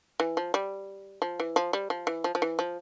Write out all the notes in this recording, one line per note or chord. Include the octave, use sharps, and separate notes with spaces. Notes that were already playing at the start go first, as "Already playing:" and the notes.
E3
F3
G3
F3
E3
F3
G3
F3
E3
F3
F3
E3
F3